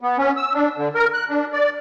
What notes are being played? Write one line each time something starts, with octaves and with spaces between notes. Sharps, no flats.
B3
C#4
E6
D4
D3
A#4
F#6
D4
D5